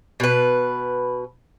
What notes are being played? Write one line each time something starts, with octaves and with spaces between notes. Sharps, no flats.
B2 B4